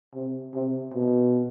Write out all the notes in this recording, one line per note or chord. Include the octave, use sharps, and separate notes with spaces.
C3
C3
B2